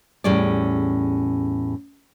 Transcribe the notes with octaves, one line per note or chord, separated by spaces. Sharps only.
E2 A2 G3 C#4 G#4 D5